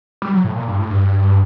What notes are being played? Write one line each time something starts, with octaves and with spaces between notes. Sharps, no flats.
G3
F#3
A2
A#2
G2
A2
G2